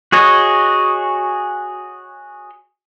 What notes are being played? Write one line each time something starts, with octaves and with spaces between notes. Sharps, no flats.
F#4 G#4 C#5 D#5